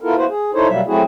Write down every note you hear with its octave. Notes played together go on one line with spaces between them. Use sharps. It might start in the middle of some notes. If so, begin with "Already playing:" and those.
B3 E4 F4 A4 A#4
A#3 B3 E4 F#4 B4 C5
G#4
D#4 E4 A4 C5 C#5
B2 F#3 G3 A#3 E5
F#3 A3 C4 E4 F#4 G#4